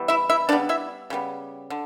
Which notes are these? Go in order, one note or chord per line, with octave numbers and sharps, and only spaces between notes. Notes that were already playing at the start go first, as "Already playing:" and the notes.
Already playing: E3 G3 B3
E4 E5
E4 E5
C#3 G3 B3 D4 D5
E4 E5
C#3 G3 B3
D3